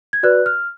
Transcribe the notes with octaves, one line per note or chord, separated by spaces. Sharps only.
G#6
F#4 B4 D5 F#6
F6